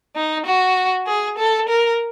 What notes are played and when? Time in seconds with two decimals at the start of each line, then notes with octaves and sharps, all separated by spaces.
0.16 D#4
0.46 F#4
1.07 G#4
1.38 A4
1.69 A#4